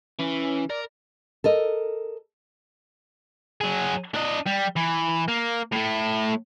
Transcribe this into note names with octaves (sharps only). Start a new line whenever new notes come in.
E3 C#4
A#4 D5
A4 A#4 D#5
F#3 G#4
D4 D#5
G3
E3
A#3
A2 A3